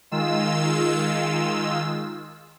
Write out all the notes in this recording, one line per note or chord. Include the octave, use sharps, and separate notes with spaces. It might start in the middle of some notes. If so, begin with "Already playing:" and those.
D#3 G#3 F4 E6